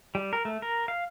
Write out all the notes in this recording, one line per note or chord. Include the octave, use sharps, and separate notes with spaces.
G3
A#4
A3
A#4
F5